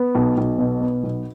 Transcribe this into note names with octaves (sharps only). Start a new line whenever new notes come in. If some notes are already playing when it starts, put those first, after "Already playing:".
Already playing: B3
B1
B1
B2
B3
B1